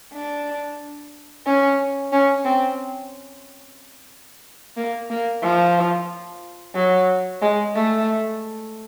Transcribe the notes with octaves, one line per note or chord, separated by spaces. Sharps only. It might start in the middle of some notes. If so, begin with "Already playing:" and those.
D4
C#4
C#4
C4
A#3
A#3
F3
F#3
G#3
A3